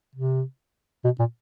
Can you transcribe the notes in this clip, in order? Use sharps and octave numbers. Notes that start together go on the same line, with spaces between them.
C3
B2
A#2